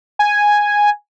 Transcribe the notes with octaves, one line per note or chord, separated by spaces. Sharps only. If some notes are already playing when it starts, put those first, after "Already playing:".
G#5